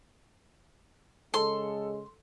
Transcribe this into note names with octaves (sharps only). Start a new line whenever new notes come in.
C#3 G#3 A4 C6